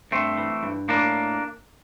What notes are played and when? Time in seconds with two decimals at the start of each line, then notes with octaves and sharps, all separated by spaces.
0.11 G2 A3 C4
0.37 E3
0.63 G2
0.88 A2 A#3 D4